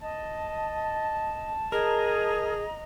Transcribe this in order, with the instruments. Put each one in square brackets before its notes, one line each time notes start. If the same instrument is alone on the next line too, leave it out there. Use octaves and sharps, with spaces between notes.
[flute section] D#5 [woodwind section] A5
[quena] G#4 [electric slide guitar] A#4 [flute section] D#5 A#5